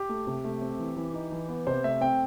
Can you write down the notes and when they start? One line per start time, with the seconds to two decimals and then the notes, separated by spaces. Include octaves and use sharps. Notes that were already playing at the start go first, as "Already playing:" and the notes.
Already playing: G4
0.09 A3
0.27 C3
0.44 A3
0.62 C4
0.79 E3
0.97 E3
1.14 D#4
1.32 E3
1.49 B3
1.67 C3 C5
1.84 A3 E5
2.01 C4 G5